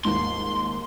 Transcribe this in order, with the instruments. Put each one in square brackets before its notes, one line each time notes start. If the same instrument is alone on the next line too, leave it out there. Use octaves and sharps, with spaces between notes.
[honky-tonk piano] D#2 G#2 [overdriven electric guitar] C6